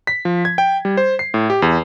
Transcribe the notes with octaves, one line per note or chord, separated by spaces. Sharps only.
B6
F3
G#6
G5
G3
C5
C7
A2
G4
E2